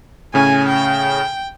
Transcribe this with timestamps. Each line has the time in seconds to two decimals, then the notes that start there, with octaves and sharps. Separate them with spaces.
0.34 A2 C#3 C#4 G#5
0.68 G5